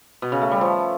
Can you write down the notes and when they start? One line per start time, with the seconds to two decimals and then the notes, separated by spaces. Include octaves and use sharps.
0.22 B2
0.32 C#3
0.42 A3
0.51 G3
0.61 F3